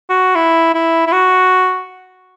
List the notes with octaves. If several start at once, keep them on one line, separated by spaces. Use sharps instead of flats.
F#4
E4
E4
E4
F#4